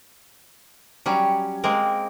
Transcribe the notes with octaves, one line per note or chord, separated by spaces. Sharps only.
F#3 G3 C#4
G#3 A#3 C4 A#4